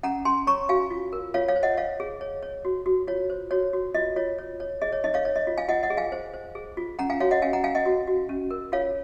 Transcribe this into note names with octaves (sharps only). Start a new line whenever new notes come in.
C#4 F#5 A#5
C#4 G#5 C6
C#5 A#5 C#6
F#4 F5 G#5
F4
A#4
F4 C#5 F5
C#5 F5
C5
D#5 F#5
C#5 F5
G#4
C#5
C#5
F#4
F#4
F4 C#5
C5
F#4 C#5
F#4
F4 D#5
F4 C#5
C#5
C#5
G#4 D#5
C#5
D#4 D#5
C#5 F5
C#5
D#5
F4
F5 G#5
F4 D#5 F#5
D#5 F#5
G#4
F5 G#5
C5
C5
G#4
F4
C#4 F#5 A#5
F5 G#5
F#4 C#5 F5
D#5 F#5
C#4 F5 G#5
F#5 A#5
C#4 F5 G#5
D#5 F#5
F#4
F#4
C#4
A#4
F4 C#5 F5